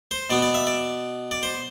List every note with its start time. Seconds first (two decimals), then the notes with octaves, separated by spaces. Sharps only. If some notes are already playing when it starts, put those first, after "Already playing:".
0.11 C5
0.30 B2 B3 D5
0.42 D5
0.54 E5
0.67 D5
1.31 D5
1.43 C5